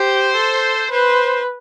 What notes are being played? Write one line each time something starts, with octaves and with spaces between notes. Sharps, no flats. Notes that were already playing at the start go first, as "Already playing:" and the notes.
Already playing: G4 C5
A4
B4 C5